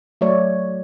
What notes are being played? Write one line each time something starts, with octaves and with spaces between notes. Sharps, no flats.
F#3 A3 C#5 D5